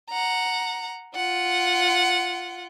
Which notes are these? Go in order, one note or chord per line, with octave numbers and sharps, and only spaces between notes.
F#5 A#5
F4 F#5